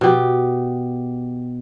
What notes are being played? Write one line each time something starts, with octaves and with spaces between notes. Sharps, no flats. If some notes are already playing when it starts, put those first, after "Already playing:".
B2 G4